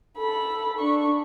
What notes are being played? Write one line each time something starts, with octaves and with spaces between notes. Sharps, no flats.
A4 B5
D4 C#6